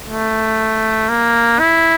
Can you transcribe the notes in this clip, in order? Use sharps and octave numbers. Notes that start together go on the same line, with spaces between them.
A3
A#3
E4